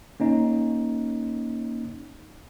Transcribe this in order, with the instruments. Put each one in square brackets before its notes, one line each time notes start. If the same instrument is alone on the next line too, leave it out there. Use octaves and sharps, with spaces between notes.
[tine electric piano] A#3 C#4 D#4